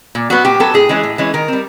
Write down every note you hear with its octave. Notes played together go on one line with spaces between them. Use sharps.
A#2
F#3 B3 F#4
A#2 G4
F#3 B3 A4
A2 G#4
E3 G#3 C#4
A2
E3 G#3 C#4
D#3 A#4
G3 C4